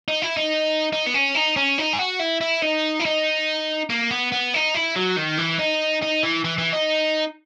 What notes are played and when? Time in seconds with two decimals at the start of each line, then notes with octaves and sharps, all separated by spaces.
0.08 D#4
0.22 E4
0.37 D#4
0.93 D#4
1.07 B3
1.14 C#4
1.35 D#4
1.56 C#4
1.78 D#4
1.93 G#4
1.99 F#4
2.20 E4
2.41 E4
2.62 D#4
2.99 E4
3.05 D#4
3.90 A#3
4.11 B3
4.32 B3
4.54 D#4
4.75 E4
4.96 F#3
5.17 D#3
5.39 E3
5.60 D#4
6.03 D#4
6.23 E3
6.45 E3
6.58 E3
6.73 D#4